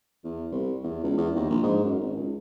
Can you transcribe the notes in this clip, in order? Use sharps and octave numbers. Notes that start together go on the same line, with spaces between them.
E2
C2
E2
C#2
E2
D#2
A#1
G#2
F#2
G#1
C#2